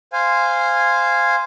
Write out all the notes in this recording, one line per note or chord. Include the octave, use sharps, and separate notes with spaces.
C5 F5 G#5